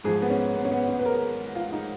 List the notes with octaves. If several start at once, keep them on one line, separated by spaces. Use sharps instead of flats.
G#2 F3 G#4
B3
C#4
B3
C#4
B3
C#4
B4
A#4
F4
F4
D#4